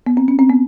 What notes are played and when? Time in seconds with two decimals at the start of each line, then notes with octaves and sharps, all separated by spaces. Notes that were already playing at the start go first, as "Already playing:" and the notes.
0.06 B3
0.17 C4
0.28 C#4
0.39 C4
0.49 B3